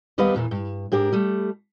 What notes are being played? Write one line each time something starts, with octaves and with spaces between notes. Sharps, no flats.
D#2 G3 B3 B4 D#5 F5
E2 A#2 E3
G2
G#2 D4 G4 A#4
G3 A3